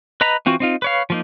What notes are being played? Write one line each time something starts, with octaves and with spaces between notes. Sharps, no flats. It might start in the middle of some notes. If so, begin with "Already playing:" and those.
B4 D#5 A#5 B5
E3 C4 F4 F#4
C4 D#4 F4
B4 C#5 F5
F3 A#3 D#4